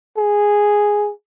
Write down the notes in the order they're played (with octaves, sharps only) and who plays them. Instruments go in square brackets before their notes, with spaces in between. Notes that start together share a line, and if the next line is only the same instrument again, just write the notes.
[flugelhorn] G#4